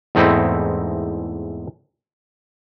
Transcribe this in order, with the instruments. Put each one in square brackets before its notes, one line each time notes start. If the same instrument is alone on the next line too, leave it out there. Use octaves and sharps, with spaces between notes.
[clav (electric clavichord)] E2 G#2 A3 C4 D#4 E4